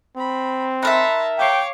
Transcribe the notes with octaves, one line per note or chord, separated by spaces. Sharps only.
C4 B5
D#4 A#4 E5 A5 B5 C6 F#6
C#5 F5 G5 D6 C7